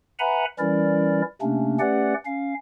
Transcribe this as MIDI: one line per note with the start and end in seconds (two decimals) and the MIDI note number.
0.19 0.45 71
0.19 0.45 76
0.19 0.45 78
0.19 0.45 80
0.19 0.45 82
0.19 0.45 83
0.59 1.22 52
0.59 1.22 55
0.59 1.22 61
0.59 1.22 64
0.59 1.22 70
0.59 1.22 74
1.41 1.79 48
1.41 1.79 57
1.41 1.79 58
1.41 1.79 61
1.41 1.79 62
1.80 2.14 57
1.80 2.14 61
1.80 2.14 67
1.80 2.14 71
1.80 2.14 74
1.80 2.14 78
2.26 2.54 61
2.26 2.54 77